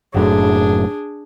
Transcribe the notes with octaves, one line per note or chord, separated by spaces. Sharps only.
F#1 F#2 A2 D4 G#4